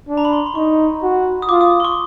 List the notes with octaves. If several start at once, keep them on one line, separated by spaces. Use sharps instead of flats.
D4
A#5
B5
C6
C6
D#4 C#6
F#4
D#6
F4 D6
D#6
C6
C#6